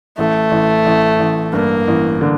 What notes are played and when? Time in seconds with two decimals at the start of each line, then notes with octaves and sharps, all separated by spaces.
0.18 A1 A3
0.51 A1
0.86 A1
1.19 A1
1.53 G2 A#3
1.88 A1
2.21 D3